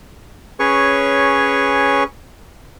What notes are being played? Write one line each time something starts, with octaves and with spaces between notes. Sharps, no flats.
C#4 G#4 B4 C#5 C#6